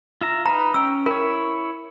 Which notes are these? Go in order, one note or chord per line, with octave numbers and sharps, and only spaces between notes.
F4 E5 A#5
D#4 B4 A#5
C#4 G5 E6
E4 A#4 C#5